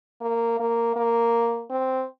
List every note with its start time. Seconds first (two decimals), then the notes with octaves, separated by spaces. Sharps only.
0.21 A#3
0.60 A#3
0.96 A#3
1.70 C4